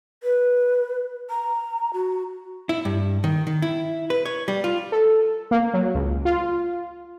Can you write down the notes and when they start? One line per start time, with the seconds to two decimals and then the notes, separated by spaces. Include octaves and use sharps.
0.23 B4
1.30 A#5
1.94 F#4
2.69 E4
2.85 G2
3.24 D#3
3.47 D#3
3.62 E4
4.10 B4
4.25 C#5
4.48 G3
4.64 F4
4.92 A4
5.51 A#3
5.74 F#3
5.95 C#2
6.25 F4